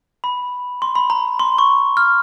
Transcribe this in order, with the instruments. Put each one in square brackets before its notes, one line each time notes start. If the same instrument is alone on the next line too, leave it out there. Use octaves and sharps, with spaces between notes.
[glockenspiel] B5
C6
B5
A#5
C6
C#6
F6